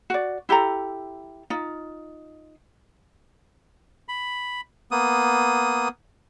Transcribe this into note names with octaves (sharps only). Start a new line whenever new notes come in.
F#4 D5
E4 G4 A4 A#5
D#4 F4
B5
A#3 B3 D#6